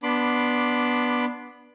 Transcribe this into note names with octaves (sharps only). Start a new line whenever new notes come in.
B3 D4 B5 C6 D6